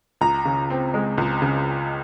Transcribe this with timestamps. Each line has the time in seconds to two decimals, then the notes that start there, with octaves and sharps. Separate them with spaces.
0.21 C#2 A#5
0.45 C#3
0.70 C4
0.94 G#3
1.18 C#2
1.42 C#3